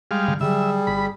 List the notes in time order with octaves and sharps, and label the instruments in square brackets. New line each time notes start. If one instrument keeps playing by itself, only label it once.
[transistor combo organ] G3 G#3 F5
[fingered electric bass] G2 D3
[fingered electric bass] D3 E3 F#3 [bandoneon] G3 [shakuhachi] G#4 [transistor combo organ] E5
[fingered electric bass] G1 [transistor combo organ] B5